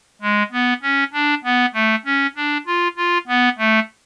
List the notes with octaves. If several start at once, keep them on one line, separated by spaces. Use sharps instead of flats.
G#3
B3
C#4
D4
B3
A3
C#4
D4
F4
F4
B3
A3